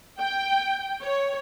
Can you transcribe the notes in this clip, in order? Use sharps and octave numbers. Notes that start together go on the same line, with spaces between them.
G5
C#5